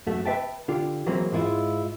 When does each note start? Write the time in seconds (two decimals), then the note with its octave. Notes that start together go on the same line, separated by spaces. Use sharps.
0.07 F#2 A3 F#4
0.25 B4 C5 E5 G5 A5
0.68 D3 F4 G4
1.06 E3 F#3 G#3 A#3 C4 E4
1.32 G#2 G#3 E4 F4